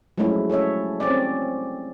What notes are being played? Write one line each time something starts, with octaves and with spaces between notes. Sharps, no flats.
F3 F#3 G#3 A3 C#4 E4
C#4 A4 C#5 E5
C4 C#4 D5